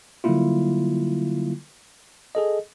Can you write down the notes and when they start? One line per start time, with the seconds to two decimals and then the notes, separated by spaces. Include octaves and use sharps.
0.24 D3 F#3 G3 A#3 E4 F4
2.35 G#4 A4 D#5